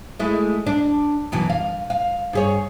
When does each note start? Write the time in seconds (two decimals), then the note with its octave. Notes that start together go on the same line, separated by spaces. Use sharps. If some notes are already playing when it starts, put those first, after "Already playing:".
0.19 G#3 A3 E4
0.66 D4
1.32 F#2 B2 E3
1.50 F5
1.90 F5
2.33 G2 G#4 C#5